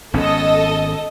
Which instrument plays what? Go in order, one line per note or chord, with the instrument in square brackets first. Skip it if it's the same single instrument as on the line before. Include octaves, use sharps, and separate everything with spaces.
[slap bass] G#1 B3 C#4 [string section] A4 D#5